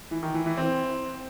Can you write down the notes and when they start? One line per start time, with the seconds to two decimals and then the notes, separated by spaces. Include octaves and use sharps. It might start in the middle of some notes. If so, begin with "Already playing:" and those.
0.11 E3
0.23 D#3
0.34 E3
0.46 E3
0.57 C4